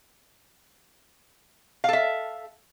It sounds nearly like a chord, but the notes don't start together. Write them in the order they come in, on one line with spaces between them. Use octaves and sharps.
F5 A4 E5